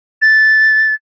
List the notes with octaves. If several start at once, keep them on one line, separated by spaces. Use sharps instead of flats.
A6